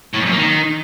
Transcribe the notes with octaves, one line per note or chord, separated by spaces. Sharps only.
A2
F2
F#2
A#3
D#3